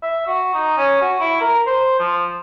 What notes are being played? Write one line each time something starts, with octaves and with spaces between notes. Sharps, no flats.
E5
F#4
D#4
C#4
F#4
E4
A#4
C5
F3